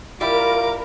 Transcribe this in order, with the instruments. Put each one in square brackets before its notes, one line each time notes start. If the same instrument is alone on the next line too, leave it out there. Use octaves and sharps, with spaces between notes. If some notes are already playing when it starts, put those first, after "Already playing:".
[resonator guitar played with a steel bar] G3 E4 [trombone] F4 [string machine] A#4 [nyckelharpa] D6